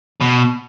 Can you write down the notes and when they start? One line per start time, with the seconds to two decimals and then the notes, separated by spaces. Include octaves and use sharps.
0.21 B2